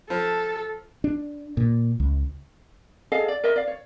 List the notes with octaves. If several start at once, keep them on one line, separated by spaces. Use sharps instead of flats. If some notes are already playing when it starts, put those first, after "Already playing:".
F3 A4
D4
A#2
C#2
G#4 A4 D#5 F5
D5
A#4 C#5 D#5 E5
D5 F5
C#5